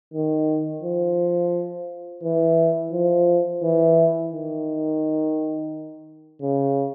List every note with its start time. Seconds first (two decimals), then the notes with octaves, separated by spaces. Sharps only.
0.14 D#3
0.83 F3
2.23 E3
2.92 F3
3.63 E3
4.32 D#3
6.42 C#3